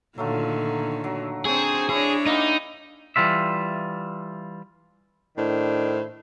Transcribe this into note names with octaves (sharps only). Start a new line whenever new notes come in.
A#2 D3 D#3 F#3 A3 F4
F#3
C4 D4 G#4 C5 C#5
D4 E4 G#4 C#5 D#5
A#3 D#4 E4 G4
E3 G3 F4 E5
A2 D#3 D4 C5